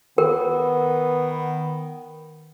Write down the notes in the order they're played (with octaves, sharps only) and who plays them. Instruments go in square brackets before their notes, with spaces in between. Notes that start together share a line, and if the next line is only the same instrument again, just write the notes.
[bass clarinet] D#3 [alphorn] B3 [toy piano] A#4